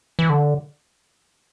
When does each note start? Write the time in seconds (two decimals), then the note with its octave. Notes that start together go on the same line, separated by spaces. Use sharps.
0.19 E3
0.30 D3